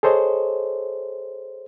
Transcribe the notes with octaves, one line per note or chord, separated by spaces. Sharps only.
G#4 A4 C5 C#5 D#5